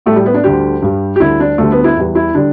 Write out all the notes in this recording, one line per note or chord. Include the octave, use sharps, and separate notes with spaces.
A2 G3 A3
G3
B3
D4
D2 D3 G3 G4
G2 G3
G4
D2 D3 G3 E4
D4
D2 D3 G3 A3
B3
E4
E2 E3 G3
E4
D3 G3 D4